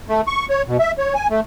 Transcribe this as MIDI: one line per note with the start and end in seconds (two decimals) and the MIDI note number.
0.09 0.21 57
0.27 0.46 85
0.50 0.63 73
0.68 0.77 47
0.79 0.92 76
0.98 1.14 73
1.15 1.27 80
1.30 1.40 57